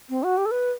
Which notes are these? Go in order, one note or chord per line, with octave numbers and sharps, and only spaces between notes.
C4
F#4
G4
A4
B4